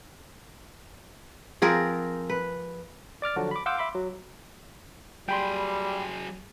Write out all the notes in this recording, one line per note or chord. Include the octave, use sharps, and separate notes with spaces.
F3 C4 G#4 A#4
B4
D5 D6 F6 A6
D3 F3 F#3 D4 F#4
B5 D6
F5 F#5 C6 D6 E6 G6
E5 B5 C6 D6
F#3
F#3 G3 G#4 G5 B5 C6